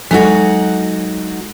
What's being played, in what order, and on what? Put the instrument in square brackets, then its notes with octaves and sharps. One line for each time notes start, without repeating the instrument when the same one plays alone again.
[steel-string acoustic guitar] F#3 D#4 F#4 [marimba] G#3 A4